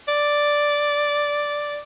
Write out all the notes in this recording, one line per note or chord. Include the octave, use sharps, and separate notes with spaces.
D5